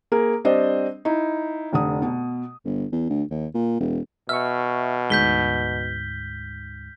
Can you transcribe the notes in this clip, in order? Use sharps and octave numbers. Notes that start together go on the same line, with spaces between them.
A#3 G#4 A#4
G3 C4 D4 C5 D#5
D#4 E4
F1 D3 D#6
B2
G1
E2
D2
D#2
A#2
E1
B2 E5 C#6 F6
D2 G#2 G6 B6 G7